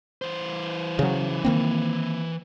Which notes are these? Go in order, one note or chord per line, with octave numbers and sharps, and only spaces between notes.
E3 C5
C#3 F#3
D#3 A#3 C4